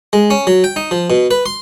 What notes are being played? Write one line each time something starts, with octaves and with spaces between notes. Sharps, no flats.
G#3
C#4
F#3
G5
D#4
F3
B2
B4
C6